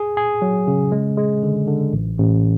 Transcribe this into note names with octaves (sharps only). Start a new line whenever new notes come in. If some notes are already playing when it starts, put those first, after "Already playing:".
Already playing: G#4
G#4
F#3
C#3
G#3
G#3
D3
D3
A1
A1